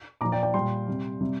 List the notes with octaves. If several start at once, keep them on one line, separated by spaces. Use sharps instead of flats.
A#2 F3 A#5 D6
D5 G5
D5 G5
A#2 G3 G5 C6
C3 G3
C3 G3